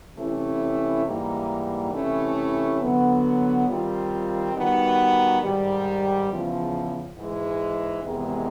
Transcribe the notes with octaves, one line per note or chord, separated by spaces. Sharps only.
C3 E3 A3 C#4 E4
G#2 E3 G3 A#3 D#4
C3 E3 A3 C#4 E4
D3 F#3 B3
D#3 G3 C4 F4
D#3 G3 B3 D#4 F#4
G#2 D#3 G3
E2 C#3 F3
G#2 E3 G#3
E2 C3 D#3 G#3